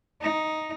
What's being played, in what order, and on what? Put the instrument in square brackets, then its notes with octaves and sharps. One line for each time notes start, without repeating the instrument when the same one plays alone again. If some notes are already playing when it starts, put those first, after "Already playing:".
[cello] D#4